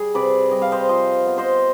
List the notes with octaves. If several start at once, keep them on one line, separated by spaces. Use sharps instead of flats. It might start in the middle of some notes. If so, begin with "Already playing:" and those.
Already playing: G3 G#4
C3 B4 D5
G3 D#5
F5
C5 D#5
F3 C5 D#5
B3
C5 D#5